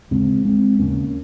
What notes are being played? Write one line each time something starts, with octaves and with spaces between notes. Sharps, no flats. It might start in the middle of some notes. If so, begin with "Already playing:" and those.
D#2 C#3 G#3 C4
G#3 C4
D#2 C#3 A#3 C#4